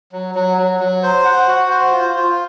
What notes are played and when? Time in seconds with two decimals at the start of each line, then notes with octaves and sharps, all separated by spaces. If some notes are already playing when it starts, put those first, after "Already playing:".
0.12 F#3
0.35 F#3
0.58 F#3
0.80 F#3
1.03 C5
1.25 F#5
1.48 F#4
1.70 C5
1.92 F4
2.16 F4